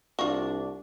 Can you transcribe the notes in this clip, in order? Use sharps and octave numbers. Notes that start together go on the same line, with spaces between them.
C2 D4 F4 F#4 C#6